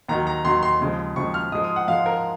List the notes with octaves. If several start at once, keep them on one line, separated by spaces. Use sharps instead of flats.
D#2 D#3 F#3 A#5
A#5
D#2 D#3 F#3 C6
C6
D#2 C#3 F3 G#3
D#2 C#3 F3 G#3 C#6
F6
G#2 F3 G#3 D#6
D#6
F#5
G#2 F3 G#3 F5
A#4